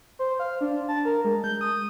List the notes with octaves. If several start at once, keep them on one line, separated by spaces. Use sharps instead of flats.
C5
F5
D4
A5
A#4
G#3
G6
D#6